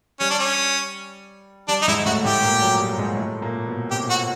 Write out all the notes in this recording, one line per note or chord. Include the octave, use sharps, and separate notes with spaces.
G3 C#4
D4
C#4
G3 D4
D#4
G#2 G#3 E4
A2 A3 F#4
A2 A3 G4
A#2 A#3
F#3
G3
G#2 G#3
A2 A3
A#2 A#3
B2 B3
C3 C4 G4
F#4